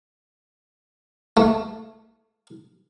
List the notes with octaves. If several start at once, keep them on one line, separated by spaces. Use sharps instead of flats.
A3